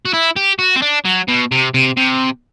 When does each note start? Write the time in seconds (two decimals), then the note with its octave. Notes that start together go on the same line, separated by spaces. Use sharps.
0.05 F#4
0.14 E4
0.36 G4
0.59 F#4
0.76 C4
0.82 D4
1.05 F#3
1.28 B2
1.52 C3
1.74 C3
1.97 C3